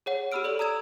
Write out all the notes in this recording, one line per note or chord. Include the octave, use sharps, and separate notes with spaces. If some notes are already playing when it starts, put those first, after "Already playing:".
G#4 C#5 F#5
G4 G#4 B5 E6 F6 D7
A4 D5 F#7
A#5 D#6 E6 G#6 E7